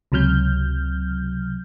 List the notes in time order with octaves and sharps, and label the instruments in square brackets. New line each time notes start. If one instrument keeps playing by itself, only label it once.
[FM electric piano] C#2 C3 F#3 F6 G6